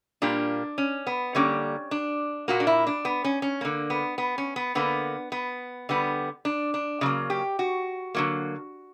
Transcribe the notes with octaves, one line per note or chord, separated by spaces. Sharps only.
A#2 G3 A#3 D4
C#4
B3
D3 G3 A#3 C#4
D4
A#2 A#3 F#4
D4
E4
D4
B3
C#4
C#4
D3 A#3
B3
B3
C#4
B3
D3 A#3 B3
B3
D3 G3 B3
D4
D4
C#3 F#3 A#3
G4
F#4
D3 F#3 A#3